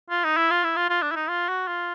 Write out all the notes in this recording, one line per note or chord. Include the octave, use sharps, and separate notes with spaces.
F4
D#4
E4
F4
E4
F4
F4
D4
E4
D#4
F4
F#4
F4